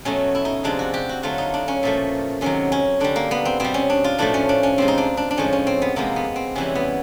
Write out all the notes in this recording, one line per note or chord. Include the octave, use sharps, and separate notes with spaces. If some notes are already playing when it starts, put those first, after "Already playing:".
B2 F#3 A3 C#4
E4
D#4
C3 F3 G#3 D4
F#4
G4
F#4
D3 F#3 A3 F4
D#4
D4
C#4
A#2 F3 A3
C3 D#3 F#3 C#4
C#4
D3 G3 D4
A#3
B3
C4
B2 G3 C4
C#4
D4
F4
A2 F3 A3 D4
C#4
D4
C#4
C3 F3 G#3 C4
D#4
D4
D4
D4
A2 F3 G#3 C#4
C#4
C4
B3
C3 F3 G#3 A#3
B3
C4
C3 E3 G3 C#4
B3